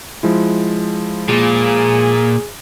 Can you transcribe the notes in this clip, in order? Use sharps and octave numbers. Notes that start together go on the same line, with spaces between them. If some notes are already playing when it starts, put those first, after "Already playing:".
F3 G#3 E4
A#2 G#4